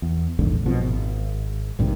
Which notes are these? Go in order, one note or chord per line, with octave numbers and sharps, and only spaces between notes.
E2
A#1 E2 G#2 D3
A#1 B2 F3 C4
G#1
A#1 G2 C3 D#3